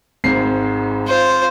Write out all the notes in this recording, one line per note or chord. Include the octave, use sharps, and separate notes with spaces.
G#1 G#2 C4 C7
F4 C5